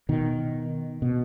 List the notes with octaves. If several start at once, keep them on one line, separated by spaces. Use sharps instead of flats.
B2 D#3
B2